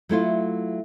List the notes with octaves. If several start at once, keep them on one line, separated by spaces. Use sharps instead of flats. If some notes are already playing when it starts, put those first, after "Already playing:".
F#3 A3 E4 F4